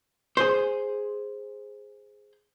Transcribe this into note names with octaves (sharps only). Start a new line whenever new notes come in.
G#4 C5